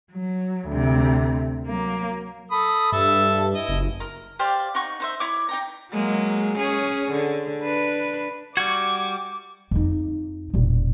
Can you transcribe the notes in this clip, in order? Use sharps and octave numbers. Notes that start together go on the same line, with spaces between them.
F#3
D2 C3
F#3 A#3
A4 B5 D#6
G2 A4 E5 A5
E4 D#5
F#1
A#4
G4 C5 D5 F5
D#4 F#5 C#6
D#4 C5 E5
E4 C#5 D6
D#4 G5 A#5
F#3 G#3 A#3
C#4 G#4 C#5
D3
D4 B4
G3 F#4 C#6 D6 G#6
F2 D#4
E1 A#2